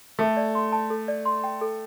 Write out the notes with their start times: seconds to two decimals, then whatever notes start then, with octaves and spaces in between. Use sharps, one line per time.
0.19 A3 A4
0.37 D5
0.55 C6
0.72 A5
0.90 A4
1.08 D5
1.25 C6
1.44 G5
1.61 A4